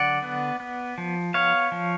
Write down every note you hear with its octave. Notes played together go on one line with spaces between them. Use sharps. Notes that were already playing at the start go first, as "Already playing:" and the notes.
Already playing: D3 F#3 D5 F#5
B3
B3
F3
B3 C#5 F5
F3